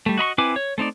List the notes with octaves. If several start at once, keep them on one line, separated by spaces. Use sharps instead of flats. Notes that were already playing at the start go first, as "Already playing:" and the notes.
G3 A3
F#4 D#5 B5 C#6
C4 E4 B4 G#5 D6
C#5
A3 C4 D#4 D5